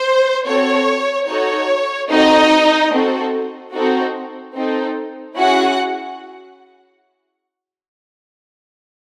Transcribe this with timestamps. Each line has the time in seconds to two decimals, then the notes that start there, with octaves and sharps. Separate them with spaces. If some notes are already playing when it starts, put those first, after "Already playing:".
Already playing: C5
0.46 C4 F#4 A4 C#5
1.28 D#4 F#4 A4 C#5
2.10 C4 D#4 F#4 A4 D#5
2.92 C4 F#4 A4
3.74 C4 D#4 F#4 A4
4.55 C4 D#4 A4
5.37 C#4 E4 F#4 G#4 F#5